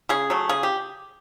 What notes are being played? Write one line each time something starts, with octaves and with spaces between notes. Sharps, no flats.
C#3 G#4
F#3 A3
C#3 G#4
G4